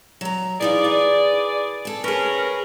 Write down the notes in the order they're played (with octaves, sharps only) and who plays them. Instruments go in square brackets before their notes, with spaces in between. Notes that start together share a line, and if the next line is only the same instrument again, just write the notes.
[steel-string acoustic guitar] F#3 A#5
[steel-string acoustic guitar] E3 D#4 F4 [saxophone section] G#4 D5
[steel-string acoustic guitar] B4
G#4 A4
[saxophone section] C#4 A#4 [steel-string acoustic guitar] G#4 B4